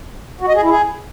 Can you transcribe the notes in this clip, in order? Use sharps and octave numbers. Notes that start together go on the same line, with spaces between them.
F#4
D#5
G#4
E4
G#4